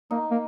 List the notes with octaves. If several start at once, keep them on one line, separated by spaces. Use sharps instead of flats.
A#3 D#4
A#3